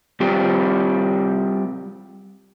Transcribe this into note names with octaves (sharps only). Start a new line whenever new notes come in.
G3 C4 F4 G4